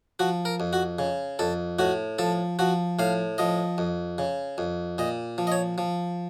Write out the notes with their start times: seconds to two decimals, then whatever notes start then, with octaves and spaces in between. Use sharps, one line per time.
0.19 F3 F#4
0.45 A#4
0.60 F2
0.73 F#4
0.99 C#3
1.39 F2 A4
1.79 A2 F#4
2.19 F3 A4
2.59 F3 F#4
2.99 A2 F5
3.38 F3 D#5
3.78 F2
4.18 C#3
4.58 F2
4.98 A#2 D#5
5.38 F3
5.47 D#5
5.52 C#5
5.78 F3